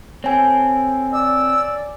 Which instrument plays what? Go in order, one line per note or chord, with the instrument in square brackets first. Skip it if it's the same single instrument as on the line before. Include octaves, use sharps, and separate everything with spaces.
[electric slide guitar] C4 A4 [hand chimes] C#5 G#5
[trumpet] D5 [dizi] E6